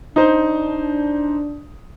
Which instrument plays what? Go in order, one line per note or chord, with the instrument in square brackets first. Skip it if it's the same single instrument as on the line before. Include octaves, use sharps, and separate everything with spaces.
[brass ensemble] D4 [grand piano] D#4 C5